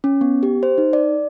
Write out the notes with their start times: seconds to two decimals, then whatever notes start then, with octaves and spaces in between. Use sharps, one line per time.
0.04 C#4
0.21 B3
0.43 G4
0.63 C5
0.78 D#4
0.93 D5